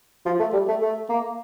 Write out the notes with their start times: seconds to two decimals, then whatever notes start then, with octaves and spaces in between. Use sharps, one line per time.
0.26 F3
0.40 A3
0.53 G3
0.68 A3
0.82 A3
1.09 A#3